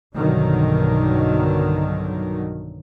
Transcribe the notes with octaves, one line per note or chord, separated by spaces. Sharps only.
B1 G2 B2 D3 D#3 F#3